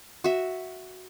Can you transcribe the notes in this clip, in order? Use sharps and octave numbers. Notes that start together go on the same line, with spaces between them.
F#4 E5